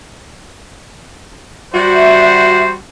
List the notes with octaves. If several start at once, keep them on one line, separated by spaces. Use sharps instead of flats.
G3 F#4 C5 E5